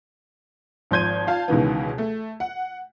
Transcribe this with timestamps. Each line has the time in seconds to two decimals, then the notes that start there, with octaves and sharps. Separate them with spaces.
0.91 G#1 F3 C6 G6 G#6 D#7
1.27 F4 F5 A5
1.48 C#2 B2 D#3 E3 B3
1.98 A3
2.40 F#5